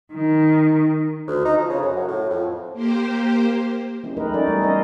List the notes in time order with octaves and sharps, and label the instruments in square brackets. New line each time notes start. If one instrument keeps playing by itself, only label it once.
[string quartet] D#3
[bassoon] D2
D#4
F3
C#3
F#2
F#4
A2
F2
[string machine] A#3 G4 C5
[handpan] E3 G#3 C4 C#4
F#3 A3 D#4 A#4 B4 D#5
C#4 D#4 F#4 A4 A#4 D5
G3 A3 B3
E3 C4 C#4 A#4 C5 D#5